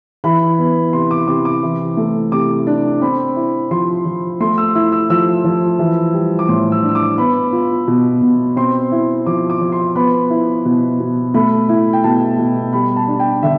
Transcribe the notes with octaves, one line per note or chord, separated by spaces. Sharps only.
E3 B5
B3
C3 C6
D6
C3 D6
D6
E3
A3
C3 D6
D4
C4 B5
E4
F3 C6
F3
A3 C6
E6
E4 E6
E6
F3 E6
F3
E3
G3
D6
A2 C6
E6
D4
E6
D6
B3 B5
F4
B2
B2
C4 C6
E4
F3 D6
D6
F3
C6
B3 B5
E4
B2
B2
A3 B5
E4
G5
B2 A5
B2
G3 B5
A5
D4
G5
D3 E5